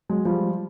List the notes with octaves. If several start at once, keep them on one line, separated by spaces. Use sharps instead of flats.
F#3 G#3
F3 G3